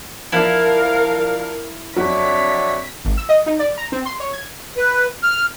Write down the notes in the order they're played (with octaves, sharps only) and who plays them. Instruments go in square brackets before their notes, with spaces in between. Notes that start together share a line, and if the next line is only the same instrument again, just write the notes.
[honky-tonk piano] F3 D4 [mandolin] E4 [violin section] A#4 F5
[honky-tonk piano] F2 F#3 [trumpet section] D4 C#5 E5 [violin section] B6
[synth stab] G#1
E6
D#5
D#4
D5
A#5
C4
C6
C#5
G#6
[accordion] B4
F6